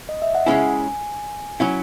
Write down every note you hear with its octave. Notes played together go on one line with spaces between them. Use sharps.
D#5
E5
F#5
C#3 G#3 C#4 E4 G#5
F#3 C#4 E4 F#5